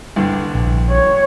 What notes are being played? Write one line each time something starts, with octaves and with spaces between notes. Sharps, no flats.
C2 G2 D3
A#1
C#5